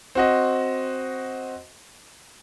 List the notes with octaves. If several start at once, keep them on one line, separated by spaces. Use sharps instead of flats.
C4 F#4 D#5